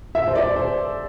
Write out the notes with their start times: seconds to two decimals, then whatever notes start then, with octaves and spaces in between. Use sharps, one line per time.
0.15 E5
0.28 C5
0.35 D5
0.56 C5